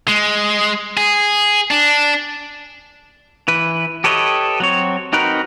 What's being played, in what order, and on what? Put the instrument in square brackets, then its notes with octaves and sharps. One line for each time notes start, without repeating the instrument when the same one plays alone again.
[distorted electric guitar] G#3
G#4
D4
[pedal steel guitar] E3 B4
G4 A4 B4 C#5 D#5
F#3 C4 C#5
C4 D#4 F#4 A#4 B4